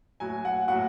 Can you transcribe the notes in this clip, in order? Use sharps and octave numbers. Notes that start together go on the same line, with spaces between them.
A2 F#3 G#5
F#5
A2 F#3 F#5